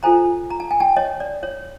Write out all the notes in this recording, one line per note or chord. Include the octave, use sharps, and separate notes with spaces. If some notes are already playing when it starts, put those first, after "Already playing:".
F4 A4 C5 G#5 A#5
A#5
A5
G#5
G5 A5
C#5 D#5
D5
C#5